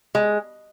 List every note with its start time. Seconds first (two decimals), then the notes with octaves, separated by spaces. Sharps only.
0.15 G#3